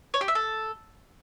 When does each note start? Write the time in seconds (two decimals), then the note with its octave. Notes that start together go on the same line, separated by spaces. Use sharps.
0.14 C#5
0.21 G4
0.28 E5
0.35 A4